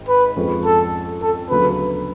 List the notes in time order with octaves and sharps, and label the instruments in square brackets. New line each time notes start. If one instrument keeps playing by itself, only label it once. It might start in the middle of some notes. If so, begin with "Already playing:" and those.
Already playing: [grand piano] G#1 G#2
[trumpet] B4
[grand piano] F2 F3 G#3 C#4
[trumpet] A4
A4
[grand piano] D2 C#3 F#3 B3 [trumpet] B4